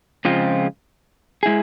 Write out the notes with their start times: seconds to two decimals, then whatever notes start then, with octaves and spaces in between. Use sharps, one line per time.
0.25 C#3 F3 G#3 C4 F4
1.43 G#3 E4 G#4